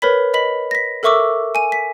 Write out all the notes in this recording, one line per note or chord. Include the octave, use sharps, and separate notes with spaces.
A#4 B4 C#5 B5 B6
D#5 B5 B6 F#7
A#6 B6
A4 A#4 E5 C#6 D6 E6
G#5 D#7
B6